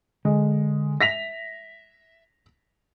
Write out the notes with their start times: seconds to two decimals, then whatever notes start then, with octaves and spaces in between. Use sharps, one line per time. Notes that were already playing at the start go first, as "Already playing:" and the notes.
0.25 D3 G#3
1.01 E5 A#6 B6 F7